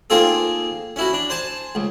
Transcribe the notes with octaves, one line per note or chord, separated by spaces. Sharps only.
A#3 C4 D#4 F4 G#4 A4
C#4 E4 F#4
D4
C5 G#5 A5
C#2